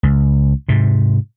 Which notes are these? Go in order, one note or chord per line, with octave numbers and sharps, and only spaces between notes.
C#2
G#2 C3